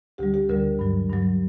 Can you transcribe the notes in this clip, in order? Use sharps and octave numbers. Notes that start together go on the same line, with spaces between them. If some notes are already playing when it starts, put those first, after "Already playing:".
D2 D3 G3 G4
G4
D2 D3 G3 A#4
G2 F#3
G2 F#3